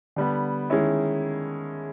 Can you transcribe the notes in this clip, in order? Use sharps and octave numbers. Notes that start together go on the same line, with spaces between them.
D3 G3 B3
D#3 G#3 C#4 E4